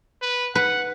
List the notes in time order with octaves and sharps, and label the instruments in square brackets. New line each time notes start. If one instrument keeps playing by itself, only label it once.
[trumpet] B4
[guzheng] B4 [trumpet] F#5